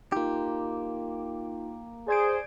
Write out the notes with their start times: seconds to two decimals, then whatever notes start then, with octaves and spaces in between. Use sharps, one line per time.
0.12 A#3 D#4 F4 G4
2.08 G#4 C5 D5 G#6 D7